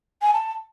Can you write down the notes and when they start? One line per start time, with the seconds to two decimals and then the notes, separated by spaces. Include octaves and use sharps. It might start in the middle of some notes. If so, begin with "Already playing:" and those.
0.22 G#5
0.33 A5